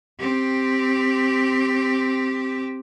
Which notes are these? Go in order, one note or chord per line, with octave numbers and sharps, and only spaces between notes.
C4 G4